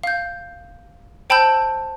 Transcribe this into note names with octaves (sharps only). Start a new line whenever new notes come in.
F5 G6
C5 G5 A5 B5 E6 G6